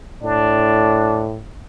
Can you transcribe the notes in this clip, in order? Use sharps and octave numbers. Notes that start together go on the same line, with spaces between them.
A2 D4